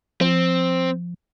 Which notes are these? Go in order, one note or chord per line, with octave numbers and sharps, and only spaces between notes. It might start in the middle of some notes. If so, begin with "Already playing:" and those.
F3 C4